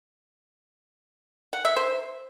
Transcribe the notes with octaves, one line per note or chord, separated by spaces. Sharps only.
F#5
E5
C5